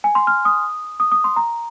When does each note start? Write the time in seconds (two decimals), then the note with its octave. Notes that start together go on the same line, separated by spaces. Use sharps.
0.04 G#5
0.15 C6
0.27 F6
0.45 D#6
1.00 D#6
1.12 D#6
1.24 C6
1.36 A#5